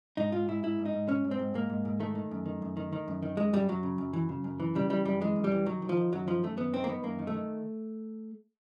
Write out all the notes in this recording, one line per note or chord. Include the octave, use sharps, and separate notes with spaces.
G#2 D#4
G#2 F4
G#2 E4
G#2 E4
G#2
D#4
G#2
G#2 C#4
G#2
C4
G#2
G#2 A#3
G#2
G#2
D#3 A3
D#3
F#2
D#3
F#2
D#3
D#3
F#2
D#3
F#2 G#3
F#2 G3
F#2 F#3
C#3
F#2
E3
C#3
F#2
E3
C#3 G3
E3 G3
F#2 G3
E3 G#3
F#2
G3
E3
D#3 F#3
D#3
F3
D#3
F#2 F#3
D#3 F3
F#2 A3
F#2 B3
D#3 C4
A#3
D#3 B3
F#2 A#3
D#3
A3
D#3